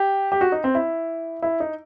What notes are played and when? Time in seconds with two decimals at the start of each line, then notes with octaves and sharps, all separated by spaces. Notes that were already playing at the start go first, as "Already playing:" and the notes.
Already playing: G4
0.32 G4
0.41 F#4
0.52 D#4
0.64 C4
0.75 E4
1.42 E4
1.60 D#4